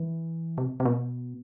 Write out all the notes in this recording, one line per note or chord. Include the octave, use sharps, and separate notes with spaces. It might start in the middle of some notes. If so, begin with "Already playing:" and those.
Already playing: E3
C3
C3
B2